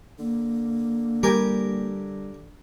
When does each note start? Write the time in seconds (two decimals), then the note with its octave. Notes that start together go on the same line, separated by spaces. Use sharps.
0.19 D3 A#3
1.23 G3 G4 A#4 G#5